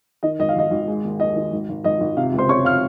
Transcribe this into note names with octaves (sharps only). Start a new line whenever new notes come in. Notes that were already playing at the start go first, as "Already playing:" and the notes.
D#3 D#5
G#1 D#5
F5
G#1 D#5
G#1
G#3
D#2
D#2 D#5
D#3
G#1
G#1
G#1 D#5
G#1
C3 F4 F5
C#2
C5 C6
C3 C#5 C#6
F5 F6